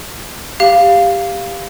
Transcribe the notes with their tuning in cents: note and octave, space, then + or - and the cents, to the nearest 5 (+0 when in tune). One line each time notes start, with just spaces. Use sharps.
G4 +15 F5 -5